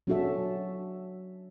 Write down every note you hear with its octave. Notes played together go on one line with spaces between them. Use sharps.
F#3 C#4 D4 F#4 A4 E5